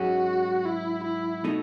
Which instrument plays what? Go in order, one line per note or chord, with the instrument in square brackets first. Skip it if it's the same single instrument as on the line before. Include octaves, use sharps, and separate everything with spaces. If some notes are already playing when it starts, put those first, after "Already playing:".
Already playing: [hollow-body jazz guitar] G#2 F#3 C#4 G#4 [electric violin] F#4
[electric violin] E4
E4
[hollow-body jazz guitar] B2 A3 D#4